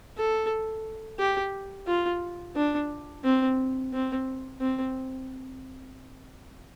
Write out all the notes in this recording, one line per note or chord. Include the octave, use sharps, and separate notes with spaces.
A4
G4
F4
D4
C4
C4
C4